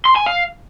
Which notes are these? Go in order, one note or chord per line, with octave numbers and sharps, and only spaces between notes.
C6
G#5
F5